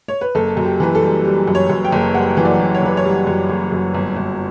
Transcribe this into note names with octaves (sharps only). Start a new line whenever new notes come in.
C#5
B4
F#1 A4
F#2
G4
E3 B4
A4
G3
G3
F#2
C#5
F#2
G5
F#1
G3 F#5
E3
D5
F#1
C#5
E3 B4
C#5
G3
F#2
F#1
F#2
G1
G1